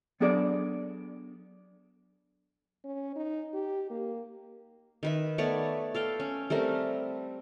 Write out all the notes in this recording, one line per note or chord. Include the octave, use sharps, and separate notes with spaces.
F#3 B3 D4 G#4 A4 D5
C#4
D#4
G4
A#3
D#3 B4 E5
A3 B3 C#5 D5
A4 F5 G5
C#4
G3 A3 C4 A#4